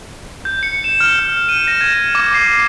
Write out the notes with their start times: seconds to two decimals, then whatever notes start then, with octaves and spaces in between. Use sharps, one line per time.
0.45 G6
0.63 C#7
0.84 E7
1.00 F6
1.19 F6
1.49 D#7
1.68 A#6
1.81 G#6
1.94 E7
2.15 D6
2.34 C7